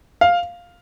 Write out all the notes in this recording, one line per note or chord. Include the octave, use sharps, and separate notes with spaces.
F5